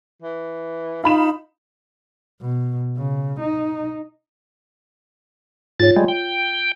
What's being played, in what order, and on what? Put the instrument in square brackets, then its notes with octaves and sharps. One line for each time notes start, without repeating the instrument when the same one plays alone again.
[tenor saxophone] E3
[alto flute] D#4 [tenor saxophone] F4 [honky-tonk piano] F5 B5 E7
[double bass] B2
C#3
D#4
[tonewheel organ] G#2 A6 [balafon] F4 C#5
[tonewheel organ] G3 G#3
G5